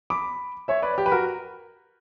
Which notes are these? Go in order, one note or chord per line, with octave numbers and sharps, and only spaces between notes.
B5 D6
C#5 E5
B4 D5
G4
B4
F#4 A#4